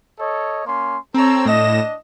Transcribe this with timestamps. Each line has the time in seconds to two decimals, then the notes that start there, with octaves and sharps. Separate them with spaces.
0.18 A4 C#5 D#5
0.65 A#3 C#4 C6
1.14 C4 A4 C#5 A#5 E6
1.46 A2 D4 D#5 A#6 E7